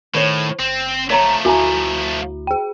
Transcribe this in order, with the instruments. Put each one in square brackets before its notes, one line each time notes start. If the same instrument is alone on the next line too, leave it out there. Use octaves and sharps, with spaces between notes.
[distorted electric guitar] A2 [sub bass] D#3 [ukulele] C5 C#5
[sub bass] F#1 [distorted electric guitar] C4
[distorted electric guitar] F3 A3 [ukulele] C#5 A#5
[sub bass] D2 [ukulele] E4 G#5 A#5 [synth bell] F#4
[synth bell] G#4 G5